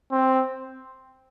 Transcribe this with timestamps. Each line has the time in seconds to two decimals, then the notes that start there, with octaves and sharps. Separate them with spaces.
0.12 C4